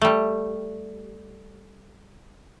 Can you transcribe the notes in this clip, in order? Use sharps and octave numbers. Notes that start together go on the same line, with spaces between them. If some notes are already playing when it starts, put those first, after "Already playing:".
G3 A3